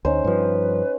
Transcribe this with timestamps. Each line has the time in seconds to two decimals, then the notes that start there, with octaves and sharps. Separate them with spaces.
0.05 D2 C#4 D#4 C5
0.25 G2 F3 B4